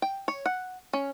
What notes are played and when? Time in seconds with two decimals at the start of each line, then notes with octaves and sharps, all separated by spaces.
0.02 G5
0.28 C#5
0.46 F#5
0.93 C#4